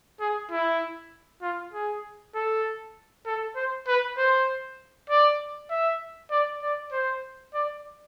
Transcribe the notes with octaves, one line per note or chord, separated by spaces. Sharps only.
G#4
E4
F4
G#4
A4
A4
C5
B4
C5
D5
E5
D5
D5
C5
D5